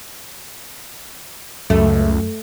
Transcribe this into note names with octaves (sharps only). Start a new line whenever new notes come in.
C#2 F#2 A3